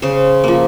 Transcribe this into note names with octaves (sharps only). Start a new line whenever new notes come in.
C#3 C5
F3 A#3